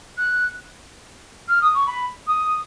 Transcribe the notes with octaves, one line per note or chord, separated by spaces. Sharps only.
F#6
F6
D#6
C#6
B5
D#6